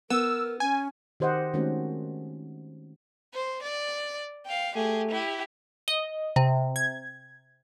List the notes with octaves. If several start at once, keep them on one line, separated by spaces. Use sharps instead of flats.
B3 A#4 E6
C#4 G#5
D#3 G4 C5 D#5 F#5
D#3 G#3 A3 C4 C#4 F#4
C5
D5
F5 G5
A3 G4 G#4
E4 G4
D#5
C3
G#6